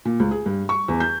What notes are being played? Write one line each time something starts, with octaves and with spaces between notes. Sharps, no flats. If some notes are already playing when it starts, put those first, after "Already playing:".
A#2
C#2
G#4
G2
C#6
E2
G6